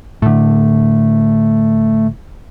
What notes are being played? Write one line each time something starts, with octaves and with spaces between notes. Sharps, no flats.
A2 D3 A3